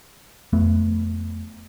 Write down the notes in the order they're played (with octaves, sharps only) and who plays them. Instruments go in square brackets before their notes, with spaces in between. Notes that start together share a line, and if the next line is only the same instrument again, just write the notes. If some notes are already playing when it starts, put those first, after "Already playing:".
[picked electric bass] F2 A3 B3